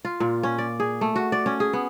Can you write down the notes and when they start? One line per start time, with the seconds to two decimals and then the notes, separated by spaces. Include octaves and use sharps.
0.05 F4
0.20 A#2
0.43 C#4
0.58 D5
0.80 G#4
1.01 A3
1.16 F#4
1.32 D5
1.46 C#4
1.60 G#4
1.73 B3